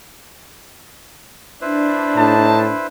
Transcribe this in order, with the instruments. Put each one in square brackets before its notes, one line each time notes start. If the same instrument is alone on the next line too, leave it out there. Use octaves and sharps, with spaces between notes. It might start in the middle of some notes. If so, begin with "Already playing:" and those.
[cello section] D4 [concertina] E4 B4 C5
[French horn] A2 [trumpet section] D#4 A5